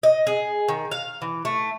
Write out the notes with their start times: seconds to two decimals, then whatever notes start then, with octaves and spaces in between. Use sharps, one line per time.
0.03 D#5
0.27 G#4
0.68 D#3
0.91 F5
1.22 E3
1.45 A3